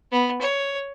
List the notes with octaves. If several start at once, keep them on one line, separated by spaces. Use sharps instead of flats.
B3
C#5